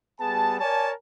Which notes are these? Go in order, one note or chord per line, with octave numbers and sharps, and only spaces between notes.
G3 B3 G#4 A5
A#4 C#5 D5 G#5 A5